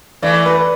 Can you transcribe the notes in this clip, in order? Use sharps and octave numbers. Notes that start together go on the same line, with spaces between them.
E3 A3 D5
B4